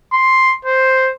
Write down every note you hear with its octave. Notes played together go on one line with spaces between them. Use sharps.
C6
C5